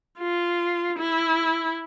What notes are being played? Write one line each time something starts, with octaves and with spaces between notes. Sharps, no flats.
F4
E4